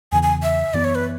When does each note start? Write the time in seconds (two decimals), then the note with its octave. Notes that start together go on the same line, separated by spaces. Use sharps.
0.12 E2 C#3 E3 G#5
0.23 G#5
0.43 E5
0.74 F#2 E3 B3 D5
0.84 C#5
0.95 B4